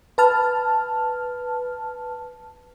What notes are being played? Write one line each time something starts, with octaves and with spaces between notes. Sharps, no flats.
B4 A5 F6